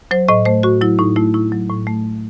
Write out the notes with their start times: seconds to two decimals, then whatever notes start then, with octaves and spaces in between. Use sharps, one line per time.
0.11 F#3 C5
0.28 A2 D#5
0.45 A3 C5
0.63 A2 F#4
0.81 F#3 E4
0.99 A2 D#4
1.16 A3 E4
1.34 A2 E4
1.52 F#3
1.70 A2
1.87 A3